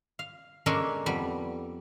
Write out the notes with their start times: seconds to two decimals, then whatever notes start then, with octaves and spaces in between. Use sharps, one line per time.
0.19 F5
0.66 G#3 A#3 C#4 D4 A4 A#4
1.06 F2 G3 B3